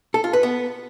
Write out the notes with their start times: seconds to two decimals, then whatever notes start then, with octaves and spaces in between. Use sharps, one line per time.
0.14 A4
0.24 F4
0.33 B4
0.43 B3